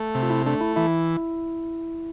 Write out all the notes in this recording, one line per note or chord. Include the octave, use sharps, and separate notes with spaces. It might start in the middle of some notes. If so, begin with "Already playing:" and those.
Already playing: A3
C3
F4
E4
A3 D4
E4
E3 E4